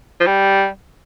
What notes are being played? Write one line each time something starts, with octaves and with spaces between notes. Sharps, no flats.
F3
G3